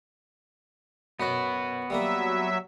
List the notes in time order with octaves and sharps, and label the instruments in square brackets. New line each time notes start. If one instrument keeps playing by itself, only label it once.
[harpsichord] F#2 D#5 [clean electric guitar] B3 F#4
[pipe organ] F#3 E5 [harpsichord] G3 A#3 A#4